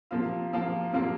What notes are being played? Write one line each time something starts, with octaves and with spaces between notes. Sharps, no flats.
C3 F3 A#3 F4
C3 F3 A#3 F4
C3 F3 A#3 F4